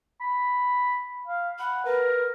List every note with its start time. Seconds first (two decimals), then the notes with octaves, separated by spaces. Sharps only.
0.21 B5
1.27 F5
1.59 F#5 B5
1.85 A#4 B4